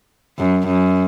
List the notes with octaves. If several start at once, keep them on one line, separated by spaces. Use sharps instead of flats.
F#2
F#2